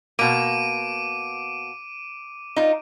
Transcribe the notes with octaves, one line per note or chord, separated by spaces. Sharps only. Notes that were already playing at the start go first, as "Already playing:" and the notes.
B2 A#3 D6 D7 D#7
D#4 F4